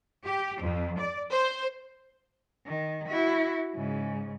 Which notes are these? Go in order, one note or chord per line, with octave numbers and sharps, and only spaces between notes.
G4
F2
D5
C5
D#3
E4 F#4
G#2 C#3